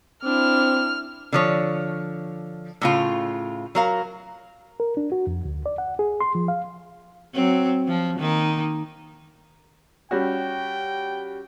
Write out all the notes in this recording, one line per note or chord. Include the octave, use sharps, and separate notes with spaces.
C4 D4 E4 F6
D3 F3 C#5
A2 C#3 F4
F#3 A#4 F5
A#4
D4
F#4
F2
D2
D5
F#5
G#4
C6
F3
F5
F#3 C4
F3
D#3 A#3 D#4
G3 C#4 F#4 G5